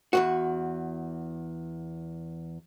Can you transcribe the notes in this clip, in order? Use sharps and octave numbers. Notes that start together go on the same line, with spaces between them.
E2 G2 F#4